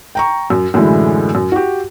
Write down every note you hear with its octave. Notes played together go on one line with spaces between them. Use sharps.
G5 A#5 C#6
F#2
F#2 A2 D3 E3 G#3 E4
F#2
F#4 G4